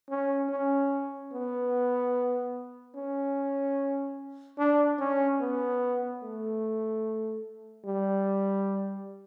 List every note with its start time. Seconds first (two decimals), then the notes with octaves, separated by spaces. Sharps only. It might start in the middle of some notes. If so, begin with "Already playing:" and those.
0.10 C#4
0.50 C#4
1.32 B3
2.95 C#4
4.59 D4
4.99 C#4
5.40 B3
6.23 A3
7.85 G3